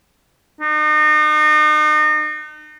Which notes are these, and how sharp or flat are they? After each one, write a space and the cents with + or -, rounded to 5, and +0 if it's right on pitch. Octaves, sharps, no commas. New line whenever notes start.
D#4 -35